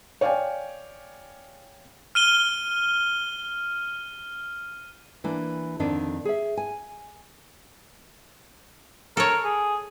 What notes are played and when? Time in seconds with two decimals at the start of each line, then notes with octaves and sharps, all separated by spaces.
0.21 C#5 D5 F5 G5 G#5
2.15 F6 D#7 G7
5.24 E3 A#3 D4
5.80 F2 D3 D#3 C4 D4
6.25 G#4 E5
6.57 G#5
9.17 A4 A#4 C#5
9.44 G#4